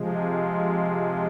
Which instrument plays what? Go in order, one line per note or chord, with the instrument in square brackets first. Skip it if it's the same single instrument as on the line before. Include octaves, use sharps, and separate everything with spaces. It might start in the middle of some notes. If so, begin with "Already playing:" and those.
Already playing: [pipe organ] C3 F3 G#3